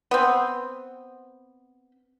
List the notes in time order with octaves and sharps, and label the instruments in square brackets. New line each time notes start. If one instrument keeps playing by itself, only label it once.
[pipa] B3 C4